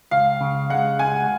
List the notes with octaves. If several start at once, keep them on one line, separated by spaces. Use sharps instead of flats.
C#2 F5
C#3
G#3 F#5
C#2 G#5